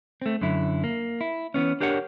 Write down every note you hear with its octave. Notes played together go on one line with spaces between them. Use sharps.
A3 C4
F#2 D3 E4
A#3
E4
E3 B3 C#4
D4 G4 A#4 C#5 F#5